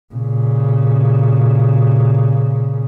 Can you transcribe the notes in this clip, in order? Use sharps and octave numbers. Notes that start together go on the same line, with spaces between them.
A#2 C#3